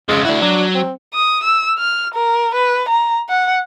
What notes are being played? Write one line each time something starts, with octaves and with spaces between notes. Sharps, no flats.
F2 C#3 G#3
D4 E4 F#4
F#3 D4
C4
D#6
E6
F6
A#4
B4
A#5
F#5